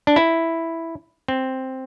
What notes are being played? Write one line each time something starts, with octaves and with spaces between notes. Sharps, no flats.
D4
E4
C4